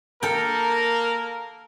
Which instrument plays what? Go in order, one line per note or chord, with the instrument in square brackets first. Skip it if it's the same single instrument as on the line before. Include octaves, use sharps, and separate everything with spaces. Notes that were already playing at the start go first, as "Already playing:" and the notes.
[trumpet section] A#3 A#4 [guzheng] A4 G5